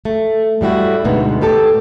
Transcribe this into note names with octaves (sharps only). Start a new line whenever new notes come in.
A3
A2 G3 E4 F#4
D2 G#2 B2 B3
A2 G4 A4 A5